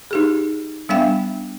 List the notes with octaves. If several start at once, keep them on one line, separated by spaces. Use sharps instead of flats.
D#4 G4 G#4
G3 B3 D4 E5 F5 G5